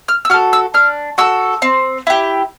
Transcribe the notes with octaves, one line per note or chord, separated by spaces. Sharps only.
F6
E6
F#4 A4 F6
E6
D4 F6
F#4 A4 E6
C4
E4 G4